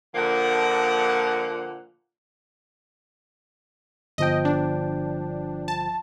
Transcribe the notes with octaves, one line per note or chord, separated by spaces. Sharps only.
A#2 D3 F3 A#3 F#5
G1 F3 D#5 G5
D4
A5